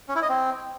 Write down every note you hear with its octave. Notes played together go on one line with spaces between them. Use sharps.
C#4
E4
D#5
C4